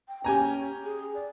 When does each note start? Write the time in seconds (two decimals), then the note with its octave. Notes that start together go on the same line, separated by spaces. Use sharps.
0.08 G5
0.24 C#4 G4 G#5 A#5
0.85 G#4
1.14 D5